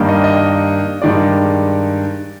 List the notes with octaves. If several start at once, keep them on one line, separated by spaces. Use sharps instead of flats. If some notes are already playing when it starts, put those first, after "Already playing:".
Already playing: G2 D#3 G3 A#3
D#5
D#5
G2 D#3 G#3 D5